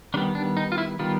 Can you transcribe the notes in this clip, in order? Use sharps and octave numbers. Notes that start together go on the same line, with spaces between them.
D#3 G3 B3 D4
D4
D#4
F4
E4
D#3 G3 B3 F4